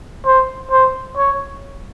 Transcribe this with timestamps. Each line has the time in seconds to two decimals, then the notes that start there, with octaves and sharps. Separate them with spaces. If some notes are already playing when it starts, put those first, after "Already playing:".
0.26 C5
0.71 C5
1.18 C#5